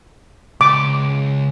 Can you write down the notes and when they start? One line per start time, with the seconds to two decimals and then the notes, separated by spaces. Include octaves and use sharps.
0.61 C#2 C6 D6